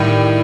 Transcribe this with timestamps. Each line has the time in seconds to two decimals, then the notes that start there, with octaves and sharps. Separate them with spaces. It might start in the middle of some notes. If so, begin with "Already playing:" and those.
Already playing: A2 D#3 G3 D#4